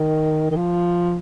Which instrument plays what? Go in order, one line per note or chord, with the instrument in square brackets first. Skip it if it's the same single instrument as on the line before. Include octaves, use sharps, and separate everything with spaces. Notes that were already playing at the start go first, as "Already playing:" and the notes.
Already playing: [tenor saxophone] D#3
D#3
F3